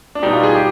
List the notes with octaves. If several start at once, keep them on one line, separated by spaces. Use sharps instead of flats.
D4
B2 G3 D#4
F4
G#4
G4